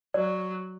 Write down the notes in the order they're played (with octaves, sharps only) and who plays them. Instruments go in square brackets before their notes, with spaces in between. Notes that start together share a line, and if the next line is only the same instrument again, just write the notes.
[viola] F#3 [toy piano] D5